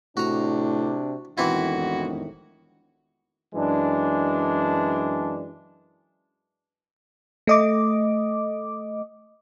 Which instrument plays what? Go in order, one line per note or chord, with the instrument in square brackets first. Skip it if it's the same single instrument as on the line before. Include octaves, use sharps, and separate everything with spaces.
[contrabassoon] A2 [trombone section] C3 D4 [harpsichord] F#4 A#5
[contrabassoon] E1 [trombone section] F2 A2 D#3 [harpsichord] E3 C4 E4 [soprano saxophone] F#4
[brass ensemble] F#2 E3 G#3 D4
[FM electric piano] A3 D#5 D6